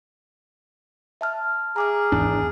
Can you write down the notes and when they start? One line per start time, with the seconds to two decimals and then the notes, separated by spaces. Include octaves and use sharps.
1.21 E5 A5 F6
1.76 G#4 A#5 D6 F6
2.12 G#1 E2 D4